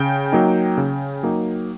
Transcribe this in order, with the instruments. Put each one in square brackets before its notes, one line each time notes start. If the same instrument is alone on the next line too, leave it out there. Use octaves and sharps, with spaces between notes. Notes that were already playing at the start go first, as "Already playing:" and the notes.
Already playing: [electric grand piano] C#3 G5
F#3 A#3 D#4
C#3
F#3 A#3 D#4